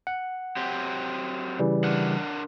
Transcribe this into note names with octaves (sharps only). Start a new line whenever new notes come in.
F#5
F#3 C4 G4
C#3 E3 G3
D4 A#4 F#5